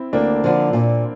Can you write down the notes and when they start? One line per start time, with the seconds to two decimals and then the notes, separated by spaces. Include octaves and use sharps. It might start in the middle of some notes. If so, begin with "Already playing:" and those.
Already playing: C4 E4
0.13 D2 A#3 D4
0.44 D3 F3
0.73 A#2